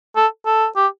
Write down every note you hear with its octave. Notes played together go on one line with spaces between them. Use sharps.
A4
A4
G4